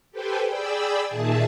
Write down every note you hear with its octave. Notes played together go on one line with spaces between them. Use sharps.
G4 A4 B4 C5 G5 G#5
G#4 D5 G5 B5 E6
A#2 D#3 G#4 E5 A5